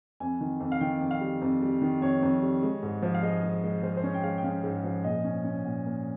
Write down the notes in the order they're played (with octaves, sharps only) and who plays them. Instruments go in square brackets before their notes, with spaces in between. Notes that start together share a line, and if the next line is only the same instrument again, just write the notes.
[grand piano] F2 G#5
D#3
F2
F5
D#3 G5
F2
F5
G3
F2
G3
D#3
F2 C#5
F2
G3
G#3
G#2
F3
F5
G#3 D#5
G#3
G#3
G#3 C5
C5
C#4 C#5
G5
G#3 F5
G5
C#4 F5
G#2
F3
A#2 D#5
C#4
C#4
A#2
A#3